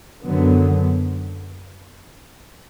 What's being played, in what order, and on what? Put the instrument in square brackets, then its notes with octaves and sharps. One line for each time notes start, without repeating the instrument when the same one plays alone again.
[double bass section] F#2 D3 F#3 B3